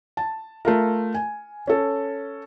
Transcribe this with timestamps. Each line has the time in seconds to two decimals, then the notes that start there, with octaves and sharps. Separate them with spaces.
0.17 A5
0.65 A3 F4 A#4
1.14 G#5
1.67 C#4 A4